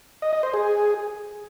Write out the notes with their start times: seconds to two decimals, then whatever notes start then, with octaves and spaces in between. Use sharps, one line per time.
0.22 D#5
0.33 D#5
0.43 C5
0.54 G#4